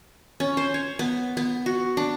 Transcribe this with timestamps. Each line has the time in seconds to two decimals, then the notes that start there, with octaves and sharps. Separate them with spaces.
0.40 C#4
0.57 C5
0.74 C#5
0.99 B3
1.37 B3
1.66 F#4
1.97 D4